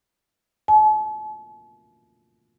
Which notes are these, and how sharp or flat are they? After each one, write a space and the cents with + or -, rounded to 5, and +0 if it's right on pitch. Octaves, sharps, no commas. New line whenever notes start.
A5 -45